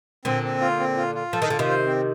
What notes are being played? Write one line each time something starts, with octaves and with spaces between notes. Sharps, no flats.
A#2 D3 C4
C4
F4
C4
F4
F4
F3 A4
D#3
D3 F4
C3 D#3
C5
C4